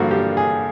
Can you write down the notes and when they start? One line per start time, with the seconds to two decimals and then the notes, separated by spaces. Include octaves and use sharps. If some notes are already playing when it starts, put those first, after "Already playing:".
Already playing: G2 D3 F3 A#3 F#4
0.11 G4
0.37 G#4